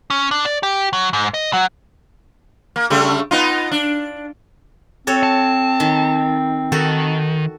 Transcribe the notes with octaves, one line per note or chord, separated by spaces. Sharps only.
C#4
D4
D5
G4
F#3
G#2
D#5
F#3
A#3
C#3 G3 A3
B3 D#4 F4
D4
C4 F#4 A4 C#5
A5
D#3
D#3 F#4 A4